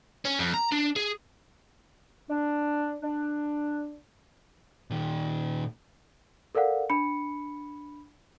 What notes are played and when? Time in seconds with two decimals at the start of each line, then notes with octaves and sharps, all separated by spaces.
0.25 C#4
0.39 F2
0.54 A#5
0.72 D4
0.96 G#4
2.29 D4
3.03 D4
4.90 A#2 D#3
6.55 A4 A#4 D5 F5 F#5
6.90 D4 B5 C#7